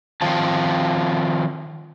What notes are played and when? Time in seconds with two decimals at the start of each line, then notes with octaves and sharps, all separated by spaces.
0.21 D#3 F3 C4 F4 A5